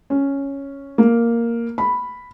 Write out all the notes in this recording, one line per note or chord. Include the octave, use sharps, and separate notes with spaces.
C#4
A#3
B5